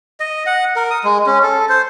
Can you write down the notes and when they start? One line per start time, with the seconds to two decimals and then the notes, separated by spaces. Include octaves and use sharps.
0.20 D#5
0.46 F#5
0.76 A#4
0.90 D#6
1.04 G#3
1.27 C#4
1.43 A4
1.69 C5